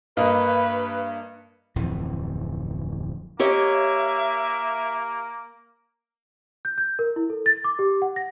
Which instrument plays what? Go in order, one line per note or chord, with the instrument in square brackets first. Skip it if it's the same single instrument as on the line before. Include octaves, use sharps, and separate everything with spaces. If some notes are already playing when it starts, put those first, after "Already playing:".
[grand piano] G2 A#3 D#5 [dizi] B4
[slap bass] D1 F2 E3
[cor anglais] A#3 [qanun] G4 C#5 D#5 [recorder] E5
[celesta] G6
G6
A#4
E4
A4
A6
D6
G4
F#5
A#6